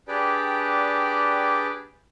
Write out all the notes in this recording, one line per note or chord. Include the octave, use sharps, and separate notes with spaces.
D4 G4 G#4 B4 D5 G5